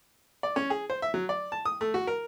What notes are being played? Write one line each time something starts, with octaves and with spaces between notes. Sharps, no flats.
D5
C#4
G#4
C5
E5
F#3
D5
A5
D#6
A3
F#4
A#4